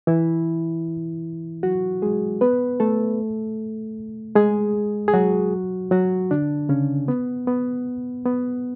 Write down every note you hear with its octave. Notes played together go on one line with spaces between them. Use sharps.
E3 E4
F#3 F#4
G#3 G#4
B3 B4
A3 A4
G#3 G#4
G#4
F#3 F#4
F#3 F#4
D3 D4
C#3 C#4
B3
B3
B3